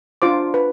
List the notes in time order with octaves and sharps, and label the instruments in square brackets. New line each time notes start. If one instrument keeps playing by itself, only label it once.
[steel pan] D4 F4 C5 D6
B4